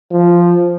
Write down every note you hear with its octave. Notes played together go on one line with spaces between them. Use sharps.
F3